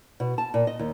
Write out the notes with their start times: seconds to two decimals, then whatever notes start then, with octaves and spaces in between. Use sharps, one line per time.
0.20 B2
0.38 A5
0.54 A#2
0.67 D#5
0.79 D#2